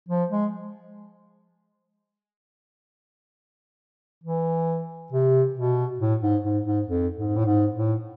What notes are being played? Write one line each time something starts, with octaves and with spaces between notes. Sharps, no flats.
F3
G#3
E3
C3
B2
A2
G#2
G#2
G#2
F2
G#2
A2
G#2
A2